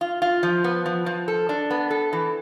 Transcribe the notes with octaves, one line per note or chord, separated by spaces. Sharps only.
F4
F4
F3
B3
F3
F3
A4
D4
B3
A4
E3